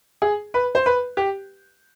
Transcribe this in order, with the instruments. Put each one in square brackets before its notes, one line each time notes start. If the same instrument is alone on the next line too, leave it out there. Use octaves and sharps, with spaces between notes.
[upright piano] G#4
B4
C5
B4
G4